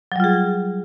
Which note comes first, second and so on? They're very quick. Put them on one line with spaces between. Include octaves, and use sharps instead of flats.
F#3 G3 F4 G#4